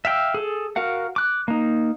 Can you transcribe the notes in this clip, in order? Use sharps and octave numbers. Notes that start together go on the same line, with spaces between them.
E5 F5 G5 E6
G#4 A4
F#4 A#4 F5 F#5
D6 F#6
A#3 D#4